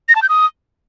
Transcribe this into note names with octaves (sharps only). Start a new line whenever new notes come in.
A#6
A5
G6
D#6